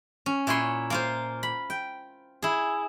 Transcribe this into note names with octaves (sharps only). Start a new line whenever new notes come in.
C#4
A#2 E4 C#5 G#5 C6
A#3 F4 C5
B5
G5
E4 G#4